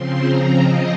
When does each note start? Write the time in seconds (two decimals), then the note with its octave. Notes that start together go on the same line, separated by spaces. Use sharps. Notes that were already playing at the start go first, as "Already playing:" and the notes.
Already playing: C#3 F3 C4 C6
0.25 A#5
0.61 D#5